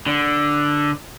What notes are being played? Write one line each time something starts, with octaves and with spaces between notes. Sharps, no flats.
D3